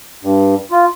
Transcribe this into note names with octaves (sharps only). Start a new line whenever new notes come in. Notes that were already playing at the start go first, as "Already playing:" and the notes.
G2
F4